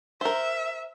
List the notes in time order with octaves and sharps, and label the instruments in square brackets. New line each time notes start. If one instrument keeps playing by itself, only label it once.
[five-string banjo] A#4 C5 [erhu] E5